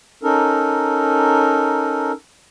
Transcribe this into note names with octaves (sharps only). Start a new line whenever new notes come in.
C#4 D#4 A4 A#4